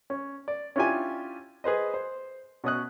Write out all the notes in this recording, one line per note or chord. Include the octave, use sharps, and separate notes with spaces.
C#4
D5
C#4 D4 E4 F4 G4 G#5
G#4 B4 C5 D#5
C5
B2 C#4 D#6 F#6